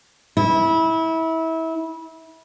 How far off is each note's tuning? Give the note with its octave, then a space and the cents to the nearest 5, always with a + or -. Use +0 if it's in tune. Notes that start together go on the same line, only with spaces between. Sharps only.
E4 -25